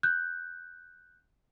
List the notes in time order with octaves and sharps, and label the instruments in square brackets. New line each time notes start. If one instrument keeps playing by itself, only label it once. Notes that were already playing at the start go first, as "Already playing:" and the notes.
[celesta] F#6 G6